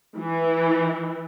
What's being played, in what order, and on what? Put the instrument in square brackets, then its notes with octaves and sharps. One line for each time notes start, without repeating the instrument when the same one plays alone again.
[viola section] E3